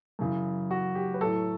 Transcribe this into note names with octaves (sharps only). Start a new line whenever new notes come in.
F#2 C#3 E3
F#4
G4
B4
A2 F#3 A4